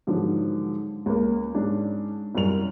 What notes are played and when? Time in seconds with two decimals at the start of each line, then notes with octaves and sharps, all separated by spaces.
0.07 G#2 D3 D#3 F3 F#3
1.06 C#2 A#3
1.55 G#2 C#4 D4
2.35 C2 F#2 A#4 F7